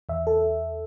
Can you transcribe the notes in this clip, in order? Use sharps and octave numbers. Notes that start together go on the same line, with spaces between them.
E2 E5
A4